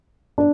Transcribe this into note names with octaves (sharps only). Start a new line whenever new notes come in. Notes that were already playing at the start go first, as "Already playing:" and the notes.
D4